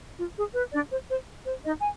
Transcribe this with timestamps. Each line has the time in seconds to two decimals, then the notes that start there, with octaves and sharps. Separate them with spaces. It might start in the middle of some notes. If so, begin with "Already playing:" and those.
0.18 F4
0.36 G#4
0.55 B4
0.73 D4 D5
0.91 C5
1.10 C5
1.46 C5
1.64 D#4 D#5
1.79 G#5